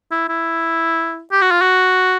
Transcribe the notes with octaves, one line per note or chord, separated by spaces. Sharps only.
E4
E4
G4
F#4
F4
F#4